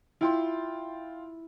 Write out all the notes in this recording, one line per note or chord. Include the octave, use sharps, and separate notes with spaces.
E4 F4 G5 C6